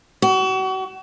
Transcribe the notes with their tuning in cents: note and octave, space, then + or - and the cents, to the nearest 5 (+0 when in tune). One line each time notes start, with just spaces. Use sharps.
F#4 +35